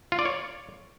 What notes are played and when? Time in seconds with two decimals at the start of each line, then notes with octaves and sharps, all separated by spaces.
0.12 F4
0.19 D5
0.25 C#5